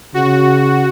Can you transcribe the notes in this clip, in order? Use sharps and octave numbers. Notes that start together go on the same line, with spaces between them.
C#3 F#4